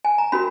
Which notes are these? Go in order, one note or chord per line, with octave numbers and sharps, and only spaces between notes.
G#5
A#5
C#4 F#4 A#4 B5